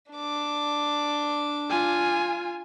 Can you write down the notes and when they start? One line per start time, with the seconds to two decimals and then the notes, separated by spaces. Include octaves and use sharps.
0.12 D4 D6
1.70 F4 G#5